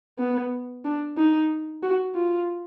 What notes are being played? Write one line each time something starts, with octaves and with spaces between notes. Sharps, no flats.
B3
D4
D#4
F#4
F4